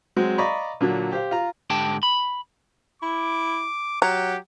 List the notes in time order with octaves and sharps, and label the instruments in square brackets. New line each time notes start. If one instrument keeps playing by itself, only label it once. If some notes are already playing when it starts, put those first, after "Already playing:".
[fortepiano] F#3 G#3 C4 F#4
D5 D#5 F5 A#5 B5 C#6
A#2 D3 F#3
G4 C5 F5
F4 A#5
[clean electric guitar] G#2 D3 G4 G5 A5
B5
[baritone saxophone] E4 [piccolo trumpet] D6
[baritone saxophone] F#3 [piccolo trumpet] G4 [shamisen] A#5